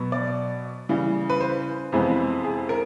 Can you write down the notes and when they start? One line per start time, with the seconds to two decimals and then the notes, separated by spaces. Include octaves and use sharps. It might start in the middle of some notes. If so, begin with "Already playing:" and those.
Already playing: B2 F#3 B3
0.12 D5
0.89 C#3 E3 G3
1.30 B4
1.41 C5
1.92 F2 C3 E3 G#3 B3
2.44 G#4
2.69 A#4